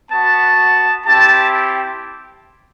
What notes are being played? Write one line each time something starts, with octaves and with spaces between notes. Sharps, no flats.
B3 F#4 A5
C4 E4 G4 A5